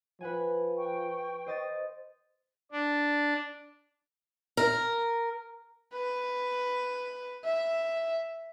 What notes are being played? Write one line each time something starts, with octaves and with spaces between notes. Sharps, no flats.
F3 B4 F#5 G#5
G5 C#6
C5 D#5 A6
D4
A#4
B4
E5